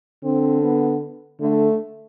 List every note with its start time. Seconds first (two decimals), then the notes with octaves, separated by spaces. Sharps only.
0.24 D3 C4
0.62 B3
1.41 D3 A3